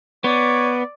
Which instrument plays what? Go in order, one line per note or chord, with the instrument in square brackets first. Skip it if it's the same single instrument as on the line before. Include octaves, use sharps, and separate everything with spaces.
[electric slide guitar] B3 [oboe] C#5 [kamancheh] D5